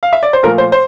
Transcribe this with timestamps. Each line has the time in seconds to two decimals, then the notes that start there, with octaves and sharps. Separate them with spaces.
0.03 F5
0.13 E5
0.23 D5
0.33 C5
0.43 A#2 F3 A3 A#4
0.58 C5
0.72 C5